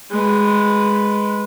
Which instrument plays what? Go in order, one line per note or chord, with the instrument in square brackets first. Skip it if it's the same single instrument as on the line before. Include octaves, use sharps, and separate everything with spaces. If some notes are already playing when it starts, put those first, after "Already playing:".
[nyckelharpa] G#3 B4